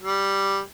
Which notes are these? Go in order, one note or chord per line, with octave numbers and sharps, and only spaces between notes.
G3